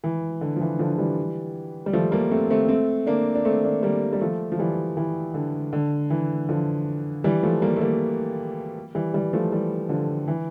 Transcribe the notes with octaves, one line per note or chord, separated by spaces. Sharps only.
E3
D3
F3
E3
D3 F3
E3 G3
G3
F3 A3
G3 A#3
A3 C4
A3 C4
A3 C4
A#3 D4
D4
A3 C4
A#3 D4
G3 A#3
G3
F3 A3
F3
E3 G3
E3
D3
D3
E3
D3 F3
E3 G3
F3 A3
G3 A#3
A3
G3 A#3
E3 G3
E3 G3
F3 A3
E3 G3
D3 F3
E3